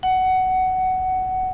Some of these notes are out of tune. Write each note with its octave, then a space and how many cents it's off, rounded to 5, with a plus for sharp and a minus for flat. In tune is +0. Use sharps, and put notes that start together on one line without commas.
F#5 +15